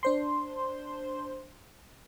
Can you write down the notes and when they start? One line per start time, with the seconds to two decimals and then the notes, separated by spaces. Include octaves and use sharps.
0.03 D4 C5 C6